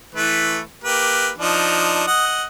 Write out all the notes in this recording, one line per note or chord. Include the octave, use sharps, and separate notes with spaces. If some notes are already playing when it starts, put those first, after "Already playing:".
E3 A3 B4
A#3 G4 B4
F3 D4 D#4
D#5 F#5